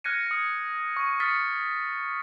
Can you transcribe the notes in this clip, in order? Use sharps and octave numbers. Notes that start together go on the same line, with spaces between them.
F6 F#6 G#6 A#6 C#7 D#7
D#6 C#7
C#6
C#6 D#6 F6 A6 B6 C#7